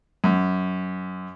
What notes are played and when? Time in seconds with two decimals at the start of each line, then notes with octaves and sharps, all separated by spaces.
0.24 F#2